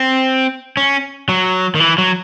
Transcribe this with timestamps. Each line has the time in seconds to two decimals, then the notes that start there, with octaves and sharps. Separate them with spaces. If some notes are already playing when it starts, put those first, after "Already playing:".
Already playing: C4
0.77 C#4
1.29 F#3
1.75 D#3
1.80 E3
1.98 F#3